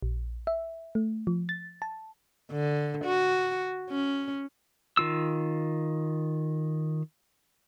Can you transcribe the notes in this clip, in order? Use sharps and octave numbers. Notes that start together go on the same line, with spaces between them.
A#1
E5
A3
F3
A6
A5
D3
F#4
C#4
D#3 F4 E6